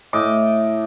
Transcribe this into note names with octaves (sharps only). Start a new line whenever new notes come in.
A2 D#5 D6